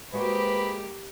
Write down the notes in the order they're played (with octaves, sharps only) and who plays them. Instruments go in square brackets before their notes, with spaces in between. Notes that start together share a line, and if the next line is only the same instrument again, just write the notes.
[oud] G#3 F#4 C5 [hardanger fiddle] A#3 G4 [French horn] B4 [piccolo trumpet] B5